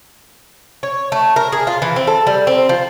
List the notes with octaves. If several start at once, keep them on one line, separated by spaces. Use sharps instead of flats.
C#5
A3
A#4
G#4
F4
E3
C4
A4
G3
C4
F3